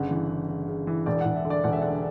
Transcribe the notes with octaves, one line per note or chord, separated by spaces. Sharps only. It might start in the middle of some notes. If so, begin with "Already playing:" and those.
Already playing: G1 C#3 F#5
E3
C#3
C#3
C#3
E3
E1 D5
E1 F#5
E5
D3
D5
E1 F#5
E5
D3 F#5